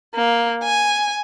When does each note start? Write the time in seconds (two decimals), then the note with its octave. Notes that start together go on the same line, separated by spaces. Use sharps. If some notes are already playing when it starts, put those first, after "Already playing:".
0.14 A#3
0.64 G#5